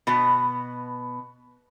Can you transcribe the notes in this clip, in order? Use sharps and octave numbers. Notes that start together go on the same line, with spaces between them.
B2 B3 F#4